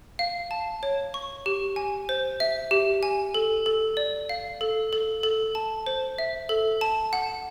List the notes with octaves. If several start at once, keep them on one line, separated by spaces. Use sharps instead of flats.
F5
A5
C#5
C#6
G4
G#5
C5
E5
G4
G#5
A4
A4
D5
F5
A4
A4
A4
A5
C5
E5
A4
A5
F#5